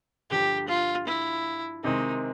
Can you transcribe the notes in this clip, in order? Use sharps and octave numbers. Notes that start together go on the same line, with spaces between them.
G2 D3 F3 G4
F4
E4
C3 D#3 G#3 C4 D#4